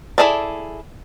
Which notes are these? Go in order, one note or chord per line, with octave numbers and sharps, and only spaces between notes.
E4 F4 G#4 A4 D5